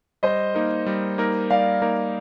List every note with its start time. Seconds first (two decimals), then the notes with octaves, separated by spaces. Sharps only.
0.23 G3 C5 D#5
0.55 A#3 D#4 A#4
0.86 G3
1.18 A#3 D#4 A#4
1.50 G3 D5 F5
1.82 A#3 D#4 A#4